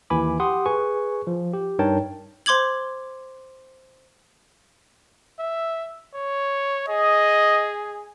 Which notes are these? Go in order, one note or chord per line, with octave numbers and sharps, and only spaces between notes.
D#2 E3 G#5 B5 D6
G4 F#5 C6 D#6
G#4 B4 G#5 C#6
F3
G4
G2 D#4 A#4 C#5 G5 A5
C5 C6 D6 G#6 F#7
E5
C#5
G#4 D#5